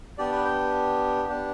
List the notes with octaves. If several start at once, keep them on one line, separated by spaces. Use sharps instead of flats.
B3 D4 G4 D5
B4
G5
B3 D4 G4